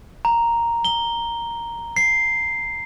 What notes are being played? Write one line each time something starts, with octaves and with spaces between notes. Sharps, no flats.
A#5
G7
C7